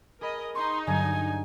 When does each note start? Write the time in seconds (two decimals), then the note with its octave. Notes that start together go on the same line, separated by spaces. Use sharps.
0.21 G#4 A#4 D#5 B5
0.55 D#4 C6 C#6 D#6
0.87 G2 D3 F#3 G#5